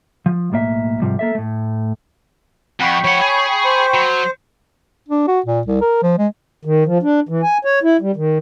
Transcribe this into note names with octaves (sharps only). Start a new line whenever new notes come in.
F3
B1 A2 A#3 E5
G#2 C3 F3 G3
A#3 A4 E5
A2 A3
F2 F#5 G5 B5 C#6
F3 C#5 F#5
G#4
C5
F#3
D4
F#4
A#2
C2
A#4
F3
G#3
D#3
F3
D4
E3
G#5
C#5
E4
G3
D#3